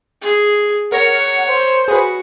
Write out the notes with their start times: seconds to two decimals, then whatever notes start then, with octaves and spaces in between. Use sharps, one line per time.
0.22 G#4
0.92 A#4 C#5 F#5 A#5
1.48 C5
1.88 F#4 G#4 B4